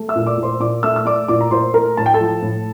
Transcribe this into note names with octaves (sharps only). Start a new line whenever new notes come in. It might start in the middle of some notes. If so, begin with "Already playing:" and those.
Already playing: A3
E5 E6
A#2
D5 D6
A#2
C5 C6
A#2 D5 D6
A3 E5 E6
E6
A3 D5 D6
A#2 D5 D6
A#5
A#2 C5 C6
A3 A#4 A#5
A2 A5
G5
A4 A5
F3
A2